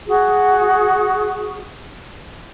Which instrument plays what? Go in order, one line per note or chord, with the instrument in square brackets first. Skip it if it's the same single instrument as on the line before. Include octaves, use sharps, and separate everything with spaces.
[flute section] F#4 G#4